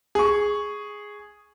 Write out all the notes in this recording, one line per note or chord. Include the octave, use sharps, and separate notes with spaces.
G#4 C#6